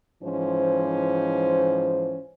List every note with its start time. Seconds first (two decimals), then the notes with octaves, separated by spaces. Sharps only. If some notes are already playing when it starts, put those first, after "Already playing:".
0.24 G#2 E3 F3 C#4 C5